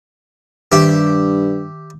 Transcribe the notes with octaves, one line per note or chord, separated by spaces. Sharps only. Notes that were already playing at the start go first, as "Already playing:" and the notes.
G2 D#3 G4 E5